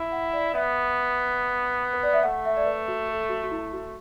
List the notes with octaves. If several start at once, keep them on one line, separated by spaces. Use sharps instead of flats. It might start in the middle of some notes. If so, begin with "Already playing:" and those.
Already playing: E4
F#5
D5
B3 E5
B4
D5
E5
A3 F#5
E5
D5
B4
F#4
A4
F#4
F#4
E4
F#4